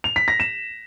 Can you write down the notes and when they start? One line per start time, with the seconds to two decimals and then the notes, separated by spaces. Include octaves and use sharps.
0.04 F7
0.16 B6
0.28 A#6
0.40 E7